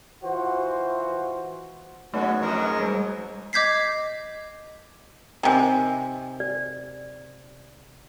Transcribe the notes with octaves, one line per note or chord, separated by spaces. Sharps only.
E3 F4 F#4 C5
G2 F#3 G#3 A3 B3 C#4 F#4
F2 G#2 F#3 A#4 D#5 C#6
G3 G#3
D#5 D6 G6 G#6 B6 C7
C3 D#3 G5 G#5
D5